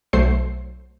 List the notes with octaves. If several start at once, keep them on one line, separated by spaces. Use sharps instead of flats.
B1 F#3 A3 C5 C7